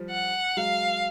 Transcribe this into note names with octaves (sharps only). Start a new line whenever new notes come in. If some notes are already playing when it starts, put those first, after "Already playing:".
Already playing: F3 G3
F#5
F#3 G#3 F5